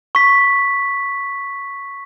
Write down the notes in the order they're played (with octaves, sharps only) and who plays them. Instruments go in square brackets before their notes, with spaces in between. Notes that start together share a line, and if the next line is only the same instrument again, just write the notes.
[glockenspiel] C#6 B6